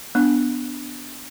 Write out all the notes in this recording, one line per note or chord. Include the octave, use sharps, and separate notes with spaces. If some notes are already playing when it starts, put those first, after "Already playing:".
B3 D4